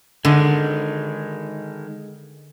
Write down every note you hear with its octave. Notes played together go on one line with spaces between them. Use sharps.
D3 D#3 G#3